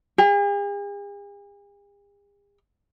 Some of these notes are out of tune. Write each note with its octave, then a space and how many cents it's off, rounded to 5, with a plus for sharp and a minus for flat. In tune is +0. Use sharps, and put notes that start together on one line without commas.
G#4 -45